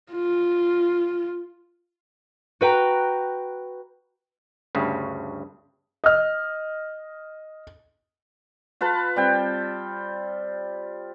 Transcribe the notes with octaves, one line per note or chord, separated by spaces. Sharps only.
F4
F#4 B4 G5 A#5
D2 G2 C#3
D#5 F6
F4 B4 A5 B5
G3 C4 G5